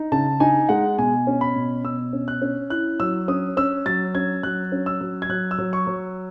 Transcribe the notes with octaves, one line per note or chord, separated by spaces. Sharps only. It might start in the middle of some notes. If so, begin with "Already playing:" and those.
Already playing: D#4
C#3 A5
D#4 G#5
G#3 F#5
B2 G#5
C#4
B5
B2
B2 E6
C#4
F#6
C#4
E4 F#6
F#3 E6
C#4 D#6
C#4 E6
F#3 A6
C#4 G#6
F#3 F#6
C#4
E6
F#3
G#6
F#3 F#6
E6
F#3
C#6
F#3